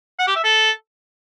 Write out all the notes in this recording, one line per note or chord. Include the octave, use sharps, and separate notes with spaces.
F#5
G4
E5
A4